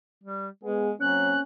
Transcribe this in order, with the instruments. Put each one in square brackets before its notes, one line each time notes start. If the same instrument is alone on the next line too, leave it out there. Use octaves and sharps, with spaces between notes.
[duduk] G3
[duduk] G#3 [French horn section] B3 G#4
[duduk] F#3 [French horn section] A#3 C4 C#4 [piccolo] F#6